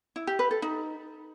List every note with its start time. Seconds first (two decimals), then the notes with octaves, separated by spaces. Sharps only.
0.16 E4
0.27 G4
0.39 B4
0.51 A4
0.62 D#4